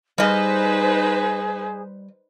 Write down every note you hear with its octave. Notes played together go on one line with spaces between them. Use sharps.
G3 D#4 G#4 B4 C5 D#5